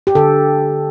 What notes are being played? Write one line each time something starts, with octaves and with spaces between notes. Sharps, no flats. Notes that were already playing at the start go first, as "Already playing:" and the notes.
G4
D3 A4